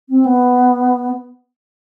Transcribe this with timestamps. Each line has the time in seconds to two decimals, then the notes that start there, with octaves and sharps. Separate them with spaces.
0.10 C4
0.26 B3